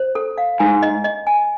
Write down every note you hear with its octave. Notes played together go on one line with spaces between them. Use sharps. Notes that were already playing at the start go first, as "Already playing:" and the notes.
Already playing: C5
A4
F5
G#2 G#5
D#5
D#5
G#5